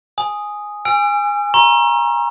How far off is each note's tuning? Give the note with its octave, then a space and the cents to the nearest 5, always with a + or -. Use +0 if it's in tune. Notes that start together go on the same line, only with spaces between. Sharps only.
G#5 +0 D#6 +0
G#5 -15 E6 +45
A#5 +20 C#6 -45